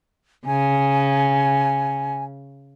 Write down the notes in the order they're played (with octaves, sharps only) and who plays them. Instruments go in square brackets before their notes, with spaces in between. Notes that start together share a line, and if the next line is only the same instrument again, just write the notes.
[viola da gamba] C#3 [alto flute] G#5